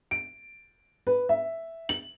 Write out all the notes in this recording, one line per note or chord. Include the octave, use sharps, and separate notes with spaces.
D7
B4
E5
F#7